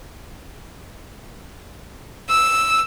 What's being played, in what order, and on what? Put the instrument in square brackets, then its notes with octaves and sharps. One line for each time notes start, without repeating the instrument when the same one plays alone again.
[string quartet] E6